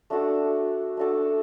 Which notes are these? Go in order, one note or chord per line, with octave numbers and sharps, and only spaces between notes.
A3 D4 F#4 A4
A3 D4 F#4 A4